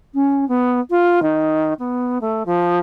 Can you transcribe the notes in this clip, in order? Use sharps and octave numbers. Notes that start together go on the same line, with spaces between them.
C#4
B3
F4
D#3
B3
A3
F3